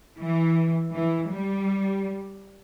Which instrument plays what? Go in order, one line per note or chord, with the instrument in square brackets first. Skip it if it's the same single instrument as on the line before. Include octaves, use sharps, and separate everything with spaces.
[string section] E3
E3
G3